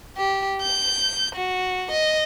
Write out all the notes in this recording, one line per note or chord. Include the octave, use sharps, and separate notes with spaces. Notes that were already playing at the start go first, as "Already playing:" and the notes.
G4
G6
F#4
D#5